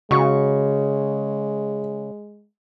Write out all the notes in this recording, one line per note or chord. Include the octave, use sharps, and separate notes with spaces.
C#3 G#3 F#4 C#6